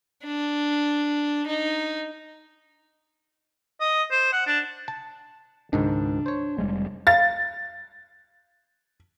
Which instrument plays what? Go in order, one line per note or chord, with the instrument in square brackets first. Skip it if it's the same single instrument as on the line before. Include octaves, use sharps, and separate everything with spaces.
[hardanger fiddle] D4
D#4
[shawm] D#5
C5
F#5
D4
[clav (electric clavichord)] A5
[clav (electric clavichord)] C#2 G#2 D#3 [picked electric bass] D4
[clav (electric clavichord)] C5 C#5
[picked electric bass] F1 G3 G#3
[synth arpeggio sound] F5 [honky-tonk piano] A6